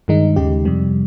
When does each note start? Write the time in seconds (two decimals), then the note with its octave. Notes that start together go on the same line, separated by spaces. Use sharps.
0.08 G2 D#3 G#3 D#4
0.36 D#2 C#3 G#3 D#4 G4
0.65 F2 C3 G3